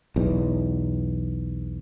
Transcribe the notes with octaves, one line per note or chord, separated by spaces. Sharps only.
B1 E2